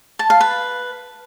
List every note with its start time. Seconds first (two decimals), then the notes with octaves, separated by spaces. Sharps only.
0.19 A5
0.30 F5
0.41 B4